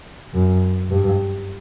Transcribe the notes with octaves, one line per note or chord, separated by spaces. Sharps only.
F#2
G2